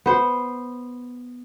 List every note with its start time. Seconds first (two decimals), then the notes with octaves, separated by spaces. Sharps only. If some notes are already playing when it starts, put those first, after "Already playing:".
0.06 B3 C5